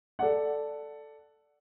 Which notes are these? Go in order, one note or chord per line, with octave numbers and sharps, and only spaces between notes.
A4 D5 F#5